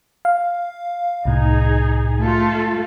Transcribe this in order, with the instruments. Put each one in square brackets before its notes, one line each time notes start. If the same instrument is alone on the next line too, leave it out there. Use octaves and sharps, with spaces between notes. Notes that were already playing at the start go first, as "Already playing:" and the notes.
[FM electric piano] F5
[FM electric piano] C2 A2 [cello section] D#4 G#4
[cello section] A3 F4 A4